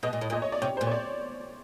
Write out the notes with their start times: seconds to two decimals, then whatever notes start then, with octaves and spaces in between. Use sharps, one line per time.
0.03 B2 D#5
0.13 A#2
0.21 A2
0.30 A#2 D#5
0.42 C#5
0.52 D5
0.62 C3 C#5
0.77 C5
0.81 A#2
0.87 C#5
0.92 D5